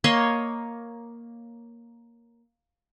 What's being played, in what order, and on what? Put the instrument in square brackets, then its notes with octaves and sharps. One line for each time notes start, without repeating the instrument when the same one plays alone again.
[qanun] A#3 C#5 D#5 C6